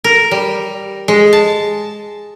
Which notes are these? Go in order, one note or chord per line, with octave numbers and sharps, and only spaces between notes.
A#4
G3
G#3
A5